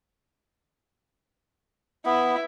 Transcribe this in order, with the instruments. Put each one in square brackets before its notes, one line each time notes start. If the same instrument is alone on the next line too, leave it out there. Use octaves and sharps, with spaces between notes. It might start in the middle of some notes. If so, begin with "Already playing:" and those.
[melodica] B3 [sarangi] E4